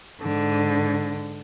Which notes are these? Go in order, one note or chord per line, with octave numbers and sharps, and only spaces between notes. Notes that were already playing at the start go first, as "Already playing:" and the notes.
G#2 D3